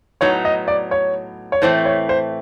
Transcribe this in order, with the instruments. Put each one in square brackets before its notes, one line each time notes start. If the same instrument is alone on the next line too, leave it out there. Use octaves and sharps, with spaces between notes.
[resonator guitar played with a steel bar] A2 F#3 B3 D#4 [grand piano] C#5
[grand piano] D#5
D5
C#5
C#5
[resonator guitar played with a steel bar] A2 E3 A3 C4 [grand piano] C5
[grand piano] C#5
C5